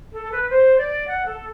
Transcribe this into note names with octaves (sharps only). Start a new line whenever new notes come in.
A4
B4
C5
D5
F#5
A4